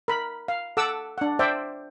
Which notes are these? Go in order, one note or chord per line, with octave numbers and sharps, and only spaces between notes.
A#4 B5
F5
A4 F#5 D6 E6
D4 F#5
C5 D5 E5 G5